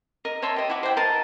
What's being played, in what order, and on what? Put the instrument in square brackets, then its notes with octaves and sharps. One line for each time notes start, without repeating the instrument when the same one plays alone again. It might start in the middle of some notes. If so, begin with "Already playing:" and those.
[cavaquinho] A#4 D#5
C#5 E5 A5 C6
G4 D#5
E4 F#5 D6
C5 G5
A#4 D#5 A5